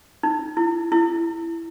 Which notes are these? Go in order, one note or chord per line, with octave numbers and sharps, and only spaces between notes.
D#4
E4
E4